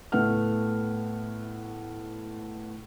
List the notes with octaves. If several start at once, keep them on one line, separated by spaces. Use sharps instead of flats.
A2 A3 B3 F#5 F6